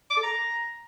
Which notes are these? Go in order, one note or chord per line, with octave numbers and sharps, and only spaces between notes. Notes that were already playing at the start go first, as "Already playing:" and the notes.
D6
A4
A#5